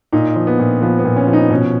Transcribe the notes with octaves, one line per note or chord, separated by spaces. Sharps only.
A#2 D#4
F3
B3
A#2
F3 B3
B3
A#2
C#4
F3
D#4
B2 C#4